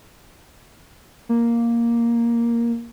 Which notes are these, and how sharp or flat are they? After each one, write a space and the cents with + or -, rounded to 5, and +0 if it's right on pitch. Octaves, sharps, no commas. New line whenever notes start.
A#3 +5